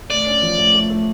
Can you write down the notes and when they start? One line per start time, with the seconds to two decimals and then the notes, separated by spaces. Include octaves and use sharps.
0.10 A3 D5
0.27 C#4
0.42 F3
0.58 A3
0.75 A3
0.90 A3